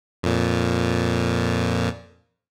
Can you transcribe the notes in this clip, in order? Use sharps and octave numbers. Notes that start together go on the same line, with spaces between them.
F2 A#2